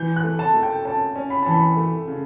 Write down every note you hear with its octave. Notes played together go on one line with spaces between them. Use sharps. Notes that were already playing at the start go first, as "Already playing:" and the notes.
Already playing: E3 G6
F#6
A3
A5
A3
G5
C#4 A5
C#4
B5
E3 A5
B5
A3
C#3